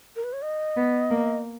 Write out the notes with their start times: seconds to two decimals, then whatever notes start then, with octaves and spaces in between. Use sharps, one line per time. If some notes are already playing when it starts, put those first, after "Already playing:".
0.16 A#4
0.24 B4
0.33 C#5
0.42 D#5
0.77 B3
1.11 A#3